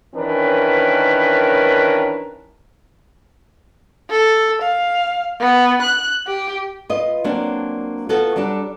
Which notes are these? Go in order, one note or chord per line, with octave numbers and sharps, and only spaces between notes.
D#3 E3 C#4 D4 A#4 B4
A4
F5
B3
F#6
G4
F4 B4 D#5
F#3 A#3 C4 D4 A#4
B3 F4 F#4 A4
F#3 G3 D4 A4